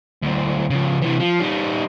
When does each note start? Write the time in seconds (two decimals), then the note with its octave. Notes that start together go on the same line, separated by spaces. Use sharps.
0.22 D2 C4
0.70 C#3 F3
1.02 C3 E3
1.20 F3
1.40 G3 D#4